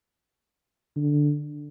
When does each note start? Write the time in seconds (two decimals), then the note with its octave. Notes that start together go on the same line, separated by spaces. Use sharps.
0.96 D3